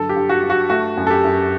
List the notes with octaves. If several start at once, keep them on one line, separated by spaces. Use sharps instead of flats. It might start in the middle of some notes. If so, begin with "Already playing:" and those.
Already playing: G2 D3 F#3 A4
G4
G2
F#4
G2
F#4
A3 F#4
F#2
A4
G4
F#2